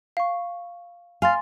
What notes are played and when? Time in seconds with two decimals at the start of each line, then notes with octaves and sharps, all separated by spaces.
0.17 F5 C#6
1.22 F5 G#5 C6 A6